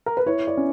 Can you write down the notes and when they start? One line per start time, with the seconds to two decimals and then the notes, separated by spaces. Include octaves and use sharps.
0.06 A#4
0.17 B4
0.26 E4 C#5
0.47 D5
0.57 C#4